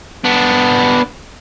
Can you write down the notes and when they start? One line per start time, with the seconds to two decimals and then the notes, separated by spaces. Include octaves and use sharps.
0.25 B3 D4